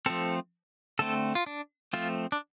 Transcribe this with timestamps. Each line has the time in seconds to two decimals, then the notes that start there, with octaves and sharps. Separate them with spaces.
0.06 F3 A3 C4 A4
0.99 D3 A3 C4 A4
1.35 F4
1.46 D4
1.93 F3 A3 C4 F4
2.32 D4